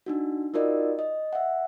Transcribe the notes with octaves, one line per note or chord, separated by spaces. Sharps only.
D4 D#4 F#4
D#4 F4 F#4 A#4 D5 D#5
D#5
E5 F#5